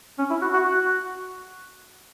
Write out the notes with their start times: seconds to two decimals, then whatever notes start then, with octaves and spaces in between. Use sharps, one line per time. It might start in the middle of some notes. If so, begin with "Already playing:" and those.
0.19 C#4
0.30 E4
0.42 F#4
0.54 F#4
0.65 F#4